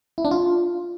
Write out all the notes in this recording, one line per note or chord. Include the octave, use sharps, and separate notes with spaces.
E4
D4
F4